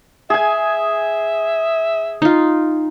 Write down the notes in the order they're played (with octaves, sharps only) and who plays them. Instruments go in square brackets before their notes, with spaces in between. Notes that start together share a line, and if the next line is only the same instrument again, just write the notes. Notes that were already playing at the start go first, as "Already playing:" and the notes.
[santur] G#4 G#5 [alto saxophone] E5
[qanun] D#4 F4